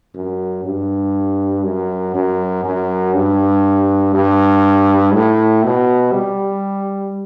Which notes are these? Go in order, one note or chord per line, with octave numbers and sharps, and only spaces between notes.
F#2
G2
F#2
F#2
F#2
G2
G2
A2
B2
G3